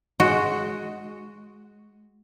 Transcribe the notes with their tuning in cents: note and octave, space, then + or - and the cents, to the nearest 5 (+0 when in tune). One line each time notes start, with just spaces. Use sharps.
G#3 +5 F#4 +0